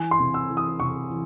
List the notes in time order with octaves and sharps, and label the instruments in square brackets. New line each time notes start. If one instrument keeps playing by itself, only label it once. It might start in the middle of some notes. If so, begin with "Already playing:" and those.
Already playing: [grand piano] E3 G#5
C6
C3
E6
E3
D#6
C3 C#6
E3